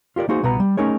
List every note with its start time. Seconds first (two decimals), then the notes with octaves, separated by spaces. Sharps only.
0.16 F4 G4 A#4 D5
0.29 A#3 D#4 F#4 G#4 C5
0.43 C2 B2 B3 B4 A#5
0.60 G3
0.77 A3 C#4 D#4 G#4 A#4 C#5